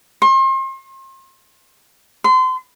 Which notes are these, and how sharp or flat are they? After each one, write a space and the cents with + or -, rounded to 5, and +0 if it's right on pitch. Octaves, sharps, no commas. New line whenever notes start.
C6 +35
C6 -30